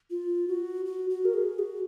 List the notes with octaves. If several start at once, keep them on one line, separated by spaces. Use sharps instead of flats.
F4
F#4
F#4
F#4
A#4
G#4
F#4